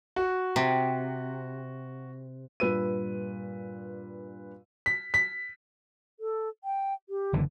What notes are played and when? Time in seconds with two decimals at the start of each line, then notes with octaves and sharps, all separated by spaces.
0.16 F#4
0.56 C3
2.60 G2 A#2 B4 E6 D#7
4.86 B6
5.14 B6
6.20 A4
6.64 G5
7.09 G4
7.33 F#1 D3 E3